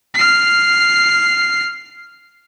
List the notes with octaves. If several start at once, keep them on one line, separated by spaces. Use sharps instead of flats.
F6 C7